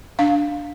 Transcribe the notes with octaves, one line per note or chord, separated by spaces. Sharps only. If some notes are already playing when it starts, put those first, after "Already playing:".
D4 F5